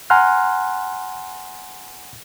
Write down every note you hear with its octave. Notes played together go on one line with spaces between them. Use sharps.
F#5 G#5 A#5 C6 F6 F#6